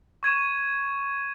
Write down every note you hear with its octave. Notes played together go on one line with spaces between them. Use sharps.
C#6 G#6 D#7 E7